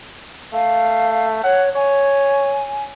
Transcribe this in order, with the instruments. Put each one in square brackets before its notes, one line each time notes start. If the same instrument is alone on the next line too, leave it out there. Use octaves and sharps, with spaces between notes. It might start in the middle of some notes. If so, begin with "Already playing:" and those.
[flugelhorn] A3 [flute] F5
[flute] C#5 [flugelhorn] F#5
[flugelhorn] C#5 [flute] G#5